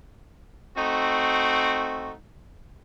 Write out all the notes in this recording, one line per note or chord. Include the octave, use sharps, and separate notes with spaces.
A3 C4 D#4 F#4